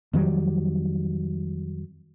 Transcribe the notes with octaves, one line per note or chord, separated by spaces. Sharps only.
F2 D#3 F#3 G3